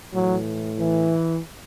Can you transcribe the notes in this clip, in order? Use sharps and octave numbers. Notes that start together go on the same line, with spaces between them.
A2 E3 F#3
E3